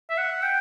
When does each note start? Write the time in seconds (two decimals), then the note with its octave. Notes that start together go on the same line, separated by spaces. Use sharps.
0.10 E5
0.18 F#5
0.43 G5